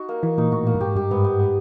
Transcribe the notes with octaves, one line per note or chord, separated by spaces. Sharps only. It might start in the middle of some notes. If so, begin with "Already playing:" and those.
Already playing: D#4 F#4
A#3
E3 A#3
A#2 D#4
A2 F#4
A#3
G2
G#2 G4
G2 G4
G#2 B3
B3
B3